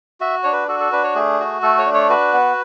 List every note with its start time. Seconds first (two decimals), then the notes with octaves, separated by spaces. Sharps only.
0.21 F#4 E5
0.43 D4 C#5
0.53 B4
0.68 F#4 A4
0.80 A4
0.92 D4 B4
1.04 C#5
1.15 A3 G#4
1.40 F#4
1.63 A3 A4
1.78 C#5
1.86 D4
1.94 C#5
2.10 F#4 B4
2.33 B3